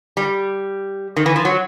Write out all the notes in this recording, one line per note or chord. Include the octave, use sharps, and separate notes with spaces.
G3
D#3
E3
F3
F#3